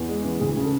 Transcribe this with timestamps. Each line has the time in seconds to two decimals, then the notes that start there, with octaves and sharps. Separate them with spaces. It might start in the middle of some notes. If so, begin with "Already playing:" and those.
Already playing: E2
0.09 G#3
0.24 E3
0.40 D2 G#4
0.57 C#3
0.64 A4